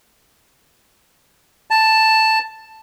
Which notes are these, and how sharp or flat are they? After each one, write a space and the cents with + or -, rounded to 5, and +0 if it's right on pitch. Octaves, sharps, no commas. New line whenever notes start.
A5 +5